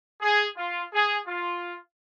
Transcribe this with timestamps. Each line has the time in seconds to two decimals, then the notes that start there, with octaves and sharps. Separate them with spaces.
0.21 G#4
0.57 F4
0.92 G#4
1.27 F4